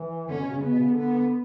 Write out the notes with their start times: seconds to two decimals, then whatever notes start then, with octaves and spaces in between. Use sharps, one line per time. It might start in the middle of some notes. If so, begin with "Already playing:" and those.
Already playing: E3
0.28 D3 C#4
0.39 B2
0.50 C#3
0.62 C#3 B3
0.71 B2
0.79 C#3
0.88 D3
0.96 B3